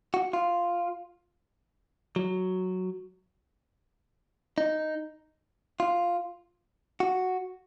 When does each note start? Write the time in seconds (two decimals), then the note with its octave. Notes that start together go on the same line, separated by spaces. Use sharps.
0.14 F#4
0.33 F4
2.16 F#3
4.58 D#4
5.80 F4
7.00 F#4